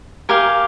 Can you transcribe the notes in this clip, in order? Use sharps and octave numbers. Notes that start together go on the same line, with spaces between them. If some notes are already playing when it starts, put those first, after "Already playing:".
G4 A#4 F5 G#5